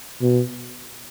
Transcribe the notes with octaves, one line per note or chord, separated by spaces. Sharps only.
B2